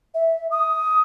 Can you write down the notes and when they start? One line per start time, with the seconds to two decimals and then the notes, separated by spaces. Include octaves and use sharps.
0.14 E5
0.51 D#6